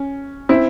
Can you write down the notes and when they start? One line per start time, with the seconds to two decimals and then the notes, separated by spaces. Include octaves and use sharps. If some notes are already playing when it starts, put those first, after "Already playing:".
Already playing: C#4
0.49 C4 E4